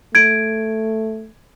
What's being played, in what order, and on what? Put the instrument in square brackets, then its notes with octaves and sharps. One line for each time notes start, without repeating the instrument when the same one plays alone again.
[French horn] A3 [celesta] G#6 D7